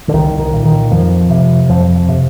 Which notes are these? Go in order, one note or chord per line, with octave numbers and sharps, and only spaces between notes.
D3
C2 D#3
D#3
A#2
D#3
F2 F3
C3
F2 F3
C3